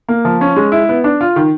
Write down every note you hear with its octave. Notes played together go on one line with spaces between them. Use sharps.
A#3
F3
C#4
G#3
E4
B3
D4
F4
D#3